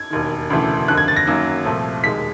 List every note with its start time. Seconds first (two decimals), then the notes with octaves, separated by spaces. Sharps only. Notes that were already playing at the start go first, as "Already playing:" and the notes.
Already playing: G#6
0.10 E1 D#2 D#3
0.50 E1 D2 C#3 E3 A3
0.88 F1 D#2 D3 F3 F#6
0.97 G#6
1.08 A6
1.16 A#6
1.27 F#2 D#3 F#3 A#3
1.65 C2 A#2 F3 A3
2.03 E1 D#2 D#3 G#3 B6